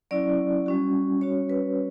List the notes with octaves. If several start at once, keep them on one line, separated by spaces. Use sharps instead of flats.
F#3 C#4 E4 D5
G3 C#4 F#4
G3 C#4 F#4 C#5
B4